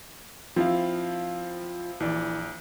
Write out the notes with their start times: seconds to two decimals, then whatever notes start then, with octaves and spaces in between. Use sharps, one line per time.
0.56 F3 C4 E4 F5
2.00 A#1 E3 D5